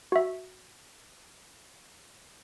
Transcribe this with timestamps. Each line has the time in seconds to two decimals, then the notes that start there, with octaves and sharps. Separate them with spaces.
0.12 F#4 E5